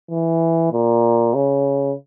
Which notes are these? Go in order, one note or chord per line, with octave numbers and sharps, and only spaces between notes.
E3
A#2
C#3